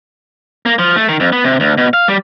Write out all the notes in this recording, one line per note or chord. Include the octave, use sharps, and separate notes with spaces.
A#3
F3
A3
D#3
F2
B3
C3
D2
B2
F5
G3